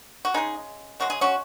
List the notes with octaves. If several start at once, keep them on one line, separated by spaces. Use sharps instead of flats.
F#4
C#3 G#3 D#4 G#4
C#3 G#3 F#4
G#4
C#4 F#4